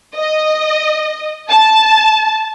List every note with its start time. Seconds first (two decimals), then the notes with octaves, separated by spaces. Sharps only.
0.17 D#5
1.50 A5